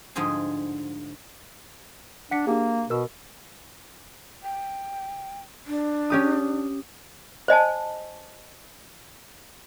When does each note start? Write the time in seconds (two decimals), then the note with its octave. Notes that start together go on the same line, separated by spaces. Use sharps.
0.15 G#2 D3 F3 G3 G#4
2.31 D4 F#5 B6 C#7
2.47 A#3 D4 G4 G#4
2.90 B2 A#4 E6
4.43 G5
5.66 D4
6.10 C#4 G4 D#6
7.48 C5 D#5 G#5 A5